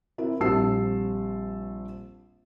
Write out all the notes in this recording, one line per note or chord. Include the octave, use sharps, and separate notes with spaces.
C4 E4 A#4
A#1 G3 C4 A5 E6 C7